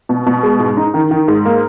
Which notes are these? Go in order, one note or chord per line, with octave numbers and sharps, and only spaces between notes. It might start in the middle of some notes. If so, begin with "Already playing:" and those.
B2
B2
G#3
G#2
D#4
D#3
D#3
G#2
A#3